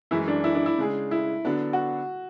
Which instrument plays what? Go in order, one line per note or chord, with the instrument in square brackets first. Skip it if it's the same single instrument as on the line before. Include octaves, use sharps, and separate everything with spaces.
[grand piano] F#2 E3 G#3 [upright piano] E4
[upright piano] D4
E4
D4
E4
[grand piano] C#3 G#3 D4 G#4
[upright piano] E4
[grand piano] D3 F#3 B3 D4
[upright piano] F#4